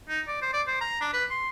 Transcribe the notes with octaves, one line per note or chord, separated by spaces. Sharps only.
D#4
D5
C5
D5
C5
A#5
D4
B4
C6